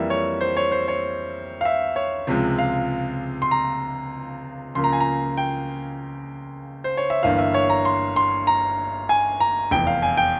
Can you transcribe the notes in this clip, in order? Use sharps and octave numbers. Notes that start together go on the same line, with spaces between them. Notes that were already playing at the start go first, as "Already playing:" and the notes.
Already playing: F2 E3 G3 A#3 E5
C#5
C5
C#5
C5
C#5
F5
E5
C#5
C#2 C3 F3 G#3
F5
C6
A#5
C#2 C#3 F3 A#3 C6
A#5
G#5
A#5
G5
C5
C#5
E5
G1 G2 E3 A#3 F5
E5
C#5
A#5
C6
C6
A#5
G#5
A#5
F1 E2 E3 G5
F5
G#5
G5